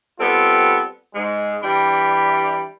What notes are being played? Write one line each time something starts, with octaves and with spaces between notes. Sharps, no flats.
G3 B3 C4 F4 A4
G#2 G#3
E3 G3 D4 B5